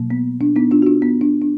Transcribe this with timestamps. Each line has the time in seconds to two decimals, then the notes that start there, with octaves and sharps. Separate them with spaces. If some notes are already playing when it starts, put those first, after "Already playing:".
Already playing: B2 F#3 A#3
0.10 B3
0.41 D4
0.56 B3 D#4
0.71 D4 F4
0.82 F#4
0.86 D4 F4
1.02 B3
1.21 D4
1.42 D4